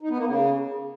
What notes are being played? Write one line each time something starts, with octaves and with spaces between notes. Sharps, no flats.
D#4
B3
A#3
C#3